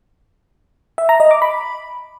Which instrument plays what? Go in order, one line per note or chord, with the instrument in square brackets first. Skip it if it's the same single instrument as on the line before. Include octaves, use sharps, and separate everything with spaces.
[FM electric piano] E5
A#5
D#5
D6
B5